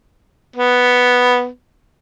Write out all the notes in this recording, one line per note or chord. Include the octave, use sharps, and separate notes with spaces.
B3